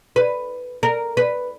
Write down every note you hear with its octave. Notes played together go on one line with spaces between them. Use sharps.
B4
A#4
B4